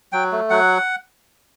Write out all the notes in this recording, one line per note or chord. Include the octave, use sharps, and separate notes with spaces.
F#3 G5
A3
F#3 F#5